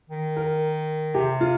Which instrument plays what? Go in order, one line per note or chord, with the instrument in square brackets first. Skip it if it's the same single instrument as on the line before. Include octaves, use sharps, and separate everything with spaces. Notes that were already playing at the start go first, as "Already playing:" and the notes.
[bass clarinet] D#3
[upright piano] A#4
[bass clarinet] C3 [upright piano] G4
[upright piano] F4